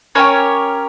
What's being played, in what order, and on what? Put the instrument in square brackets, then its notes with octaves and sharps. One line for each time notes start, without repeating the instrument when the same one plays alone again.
[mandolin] C#4 E4 G4 A#4 C#5